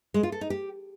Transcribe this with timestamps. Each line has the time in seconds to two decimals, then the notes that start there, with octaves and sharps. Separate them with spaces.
0.14 G#3
0.23 F4
0.32 A4
0.41 D#4
0.50 G4